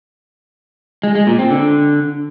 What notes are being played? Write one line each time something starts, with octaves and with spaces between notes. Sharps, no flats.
G#3
G#3
A#2
C4
D3